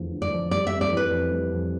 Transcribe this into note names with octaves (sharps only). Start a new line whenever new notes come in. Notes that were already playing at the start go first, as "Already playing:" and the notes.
Already playing: F1 E2 D3 F3
D3
D5
F3
G3 D5
E5
F2
D5
E3
B4
F2
G3
F2